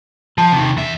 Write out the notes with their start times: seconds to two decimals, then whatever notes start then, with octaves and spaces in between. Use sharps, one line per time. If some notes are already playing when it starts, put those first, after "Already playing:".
0.38 F3 A5
0.52 C3 D#3
0.77 E2 E5